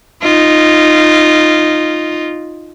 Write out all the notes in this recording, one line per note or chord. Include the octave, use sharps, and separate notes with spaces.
D#4 F4